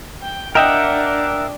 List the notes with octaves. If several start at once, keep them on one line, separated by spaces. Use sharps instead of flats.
G5
D4 A#4 D#5 E5 F#5 G5